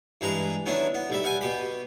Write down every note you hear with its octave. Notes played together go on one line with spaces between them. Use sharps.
G2 E3 G#3 B4 A#5
D#3 F#3 B3 D4 E4
B3
B1 G3 E5
G3 F#5 G#5
B2 G4 B5